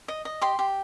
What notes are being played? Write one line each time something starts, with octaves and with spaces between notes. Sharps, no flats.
D#5
D#5
G4 C6
G4